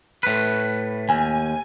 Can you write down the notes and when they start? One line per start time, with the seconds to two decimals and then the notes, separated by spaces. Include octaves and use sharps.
0.23 A2 B4
1.09 D#2 G#5